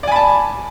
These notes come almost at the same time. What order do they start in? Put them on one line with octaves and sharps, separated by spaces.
D5 G#5 B5 A5